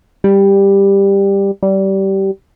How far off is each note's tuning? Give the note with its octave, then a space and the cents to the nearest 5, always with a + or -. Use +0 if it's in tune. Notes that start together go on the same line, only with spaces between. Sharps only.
G3 +10
G3 -20